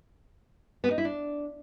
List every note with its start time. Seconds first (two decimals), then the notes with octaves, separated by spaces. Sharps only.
0.84 B3
0.91 D#4
0.98 E4
1.05 D4